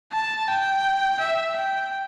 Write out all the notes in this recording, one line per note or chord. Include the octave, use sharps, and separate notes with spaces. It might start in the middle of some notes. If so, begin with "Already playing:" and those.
A5
G5
E5
G5